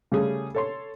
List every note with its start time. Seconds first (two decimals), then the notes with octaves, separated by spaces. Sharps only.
0.12 C#3 G3 A3 C#4 G#4
0.55 A4 C#5 C6